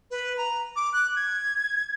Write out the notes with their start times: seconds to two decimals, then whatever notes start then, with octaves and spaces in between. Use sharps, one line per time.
0.11 B4
0.37 A#5
0.76 D6
0.93 F#6
1.16 G#6